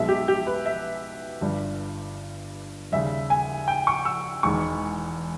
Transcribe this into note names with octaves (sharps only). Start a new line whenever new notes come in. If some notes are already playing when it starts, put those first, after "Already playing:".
Already playing: B1 B2 G#3 E5
G4
G4
B4
E5
G1 G2 G3
D#2 C#3 G3 E5
G#5
G5
C#6
E6
E1 E2 D#3 G#3 C#6